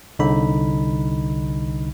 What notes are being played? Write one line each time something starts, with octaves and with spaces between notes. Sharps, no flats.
C2 D3 D#4 B5